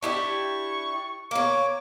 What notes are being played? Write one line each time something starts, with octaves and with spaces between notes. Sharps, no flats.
D4 E4 G4 C#6
A#3 C#5 D6